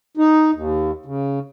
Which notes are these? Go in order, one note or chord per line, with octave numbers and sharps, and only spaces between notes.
D#4
D#2
C#3